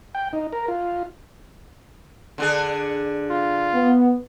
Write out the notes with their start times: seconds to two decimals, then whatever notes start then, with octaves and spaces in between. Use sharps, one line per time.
0.15 G5
0.33 D#4
0.53 A#4
0.68 F4
2.38 D3 D4 G#4
3.30 F4
3.74 B3